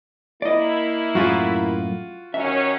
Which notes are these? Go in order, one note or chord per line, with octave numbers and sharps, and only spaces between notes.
A#3 E4 D5 D#5
F#2 A2 F4 F#4 G#4
D#3 F#3 C#4 E5